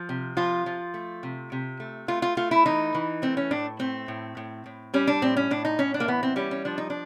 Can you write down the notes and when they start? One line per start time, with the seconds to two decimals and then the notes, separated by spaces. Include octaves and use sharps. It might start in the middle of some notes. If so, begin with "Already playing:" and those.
Already playing: F3
0.09 C3
0.37 F3 F4
0.66 F3
0.94 A3
1.23 C3
1.52 C3
1.80 A3
2.08 A3 F4
2.22 F4
2.37 A3 F4
2.51 E4
2.66 E3 D#4
2.94 E3
3.22 A3 C4
3.37 C#4
3.51 A2 D4
3.79 A3 C4
4.08 A2
4.37 A2
4.66 A2
4.94 G3 C#4
5.07 D4
5.22 A2 C4
5.36 C#4
5.51 A2 D4
5.65 D#4
5.79 A2 C#4
5.94 D4
6.00 A#3
6.08 E3 B3
6.23 C4
6.36 G3 C#4
6.51 C#4
6.65 F3 D4
6.78 D#4
6.90 D4